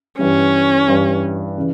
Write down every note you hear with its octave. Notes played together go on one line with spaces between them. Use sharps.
G2 E3 G3 C#4
G2 E3 G3
C#3 E3